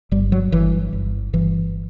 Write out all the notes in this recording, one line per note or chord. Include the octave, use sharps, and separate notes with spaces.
G1 G3
F#3
G1 E3
G1
G1 E3